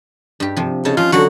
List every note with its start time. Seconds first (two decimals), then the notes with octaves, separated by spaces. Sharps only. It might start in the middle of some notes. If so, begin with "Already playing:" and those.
0.40 G2 G4
0.56 C3 F3
0.85 C#3 D#4 C#5 A5
0.97 F3 C#4 D#4 F4
1.12 D3 F3 F#3 F#4